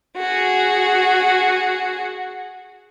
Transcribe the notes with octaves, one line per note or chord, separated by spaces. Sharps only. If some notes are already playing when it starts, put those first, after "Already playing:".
F#4 G#4